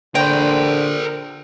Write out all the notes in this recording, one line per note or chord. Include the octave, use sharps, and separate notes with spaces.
D3 A#4 C5 G5